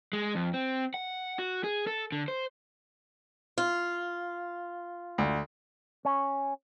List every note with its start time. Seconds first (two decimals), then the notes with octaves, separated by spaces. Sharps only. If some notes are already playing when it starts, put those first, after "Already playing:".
0.13 G#3
0.35 F2
0.54 C4
0.94 F#5
1.39 F#4
1.64 G#4
1.87 A4
2.12 D3
2.28 C5
3.58 F4
5.18 D2
6.05 C#4